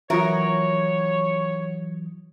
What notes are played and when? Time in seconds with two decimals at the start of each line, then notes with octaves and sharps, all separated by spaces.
0.10 E3 F#3 F4 F#4 A#4 C#5 E5 D#6